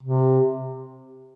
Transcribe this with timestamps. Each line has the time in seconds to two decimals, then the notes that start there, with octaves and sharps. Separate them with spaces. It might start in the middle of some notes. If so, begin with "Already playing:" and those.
0.03 C3